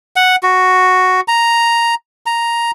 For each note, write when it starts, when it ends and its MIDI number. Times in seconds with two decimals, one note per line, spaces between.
0.16 0.36 78
0.43 1.21 66
1.28 1.95 82
2.26 2.71 82